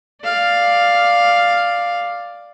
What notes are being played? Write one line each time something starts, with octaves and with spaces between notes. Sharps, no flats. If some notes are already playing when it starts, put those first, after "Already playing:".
D5 F5